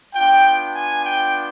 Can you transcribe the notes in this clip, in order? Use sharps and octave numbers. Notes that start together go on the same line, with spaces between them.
B3 D4 F4 G5
G#5
G5